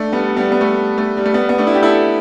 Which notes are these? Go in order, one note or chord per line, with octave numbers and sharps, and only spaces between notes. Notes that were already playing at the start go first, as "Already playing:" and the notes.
Already playing: A3 D4
G3 B3
G3 B3
B3
A3
A3
G3
A3
G3 B3
B3
A3 D4
E4
G4
E4 A4